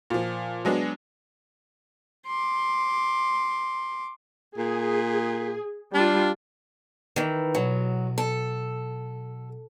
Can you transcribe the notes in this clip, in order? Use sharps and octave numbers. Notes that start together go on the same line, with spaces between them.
A#2 F3
F#3 G#3 B3 D4
C6 D6
A#2 G#4
G3 D4 F4
D#3 E3
B1 F#3
A4